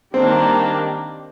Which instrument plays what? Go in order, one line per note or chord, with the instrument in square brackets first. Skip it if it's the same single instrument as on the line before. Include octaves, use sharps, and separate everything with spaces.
[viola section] D#3 G3 A#3 D4 [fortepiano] C4